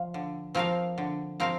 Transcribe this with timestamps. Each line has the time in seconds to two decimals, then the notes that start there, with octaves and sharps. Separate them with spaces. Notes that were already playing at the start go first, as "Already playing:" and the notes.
Already playing: F3 F5
0.14 D3
0.55 F3 C4 A#4 F5
0.98 D3
1.40 F3 C4 A#4 F5